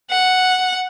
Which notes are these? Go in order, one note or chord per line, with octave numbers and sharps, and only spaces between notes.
F#5